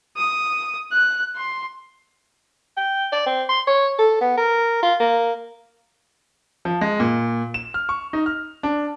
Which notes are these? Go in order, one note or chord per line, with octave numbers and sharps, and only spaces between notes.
D#6
F#6
C6
G5
D5
C4
C6
C#5
A4
B3
A#4
F4
A#3
F3
G#3
A#2
E7
F6
C#6
D#4
F6
D4